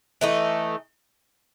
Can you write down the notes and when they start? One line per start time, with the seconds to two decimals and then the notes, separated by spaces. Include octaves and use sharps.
0.21 E3 A3 D#4